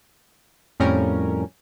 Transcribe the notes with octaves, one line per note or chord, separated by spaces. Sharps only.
F2 A2 G3 C#4 A#4